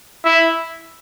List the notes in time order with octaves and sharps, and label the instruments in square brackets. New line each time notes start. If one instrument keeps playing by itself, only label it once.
[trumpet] E4